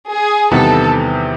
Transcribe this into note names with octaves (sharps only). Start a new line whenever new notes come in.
G#4
E2 C3 D#3 G3 B3 A4